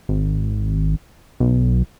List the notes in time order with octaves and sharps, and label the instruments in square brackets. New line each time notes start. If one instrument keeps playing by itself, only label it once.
[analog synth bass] G#1
B1